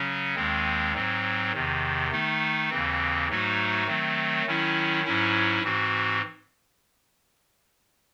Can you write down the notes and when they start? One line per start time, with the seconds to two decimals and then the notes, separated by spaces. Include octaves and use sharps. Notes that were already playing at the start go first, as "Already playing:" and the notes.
Already playing: C#3 F#3 C#4
0.36 D#2 D#3 G#3 C4
0.94 G#2 F#3 C4
1.53 E2 C3 D#3
2.11 D#3 A3 D#4
2.69 D#2 C#3 E3 C4
3.29 G#2 F#3 A3 D#4 F#4
3.87 D#3 F#3 A3 C4
4.46 D#3 F#3 C#4 E4
5.04 G#2 F#3 C#4 E4
5.63 G#2 E3 C4 F#4